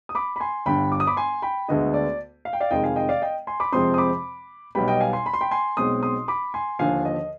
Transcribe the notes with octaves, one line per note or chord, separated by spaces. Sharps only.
D#6
B5 D6
B5
G#5 C6
G1 G2 D3 G5 B5
D6
D#6
B5 D6
G#5 C6
G5 B5
D2 D3 G#3 B3 D#5
D5
F5
G5
D5 F5
F1 F2 D#3 G#3 D#5 G5
F5 G#5
D#5 G5
D5 F5
D#5 G5
G#5 C6
B5 D6
F2 C3 F3 G#3 C4 C6 D#6
D#6
B5 D6
B1 B2 G3 B3 G5 B5
D#5 G5
F5 G#5
G#5 C6
B5
C6
G5 B5
G#5 C6
B1 B2 G#3 C4 C6 D#6
C6 D#6
B5 D6
G#5 C6
D#2 D3 F3 F5 G#5
D#5